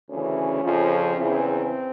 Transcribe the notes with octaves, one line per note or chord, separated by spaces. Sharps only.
D2 C#3 E3 C#4
F2 C#3 F3
E2 C#3 E3 C4